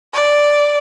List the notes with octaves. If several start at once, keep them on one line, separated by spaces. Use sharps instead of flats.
D5